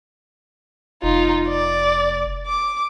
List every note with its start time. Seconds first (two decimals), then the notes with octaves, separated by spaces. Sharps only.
1.03 F1 D#4 F4
1.49 D5
2.47 D6